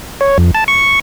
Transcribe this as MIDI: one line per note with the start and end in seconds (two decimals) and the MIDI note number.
0.21 0.38 73
0.38 0.51 41
0.55 0.64 81
0.68 1.00 85